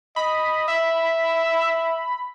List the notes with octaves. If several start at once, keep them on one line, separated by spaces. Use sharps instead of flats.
D#5 B5
E5